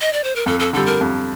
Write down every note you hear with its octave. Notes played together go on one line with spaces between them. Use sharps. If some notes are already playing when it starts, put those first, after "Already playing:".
D#5
D5
C5
A#4
F2 A4
A4
D3 G3 A4
A#4
F2